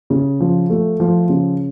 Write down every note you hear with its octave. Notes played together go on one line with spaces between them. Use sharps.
C#3
F3
A3
F3
C#3